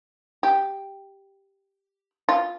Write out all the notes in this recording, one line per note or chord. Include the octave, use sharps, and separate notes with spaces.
G4
F4